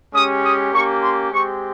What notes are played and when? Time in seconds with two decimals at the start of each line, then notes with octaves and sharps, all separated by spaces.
0.14 G#3 C#4 G4 D#6
0.44 D#6
0.73 A#3 C#4 G4 C#6
1.02 C6
1.31 G#3 C4 G4 C#6